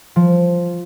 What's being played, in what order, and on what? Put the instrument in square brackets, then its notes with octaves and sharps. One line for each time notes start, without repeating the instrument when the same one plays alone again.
[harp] F3